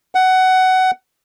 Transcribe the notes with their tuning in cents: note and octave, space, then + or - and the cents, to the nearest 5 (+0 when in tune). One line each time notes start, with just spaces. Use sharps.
F#5 +15